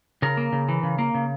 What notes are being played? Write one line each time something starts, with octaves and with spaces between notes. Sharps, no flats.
C#3 A#4
A#3
C#3
E3
C#3
A#3
C#3